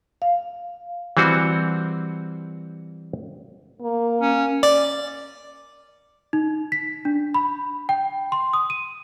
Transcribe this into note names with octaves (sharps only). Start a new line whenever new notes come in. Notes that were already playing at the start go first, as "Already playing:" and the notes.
F5
E3 G3 C4 F#4
A#3
C#4
D5
D#4
B6
D4
B5
G5
C6
D#6
D#7